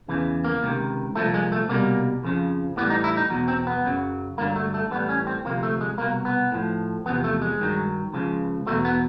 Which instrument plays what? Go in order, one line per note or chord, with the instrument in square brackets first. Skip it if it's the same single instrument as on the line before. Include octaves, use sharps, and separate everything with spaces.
[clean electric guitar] E2 C#3 E3
A#3
C#2 C3 D#3
C2 A#2 F3 A3
G#3
A3
C2 B2 G3 A#3
F2 C#3 F3
A2 E3 G3 B3
D#4
E4
D#4
E2 B2 F#3
C4
B3
F#2 C#3 F#3
G2 D3 F#3 A#3
A3
A3
A2 E3 G3 B3
C#4
C4
D2 C3 F3 A#3
A3
G#3
C2 B2 F#3 A#3
B3
A2 F3
E2 C3 F3 B3
A3
G#3
G2 D#3 F#3
C#2 C#3 F3
E2 B2 F#3 A3
B3